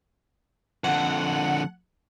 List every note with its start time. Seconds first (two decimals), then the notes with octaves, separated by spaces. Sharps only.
0.84 F2 D3 F#5